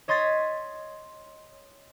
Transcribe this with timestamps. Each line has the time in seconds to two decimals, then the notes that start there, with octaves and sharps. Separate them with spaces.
0.08 C#5 D#5 C6 G#6 A6 B6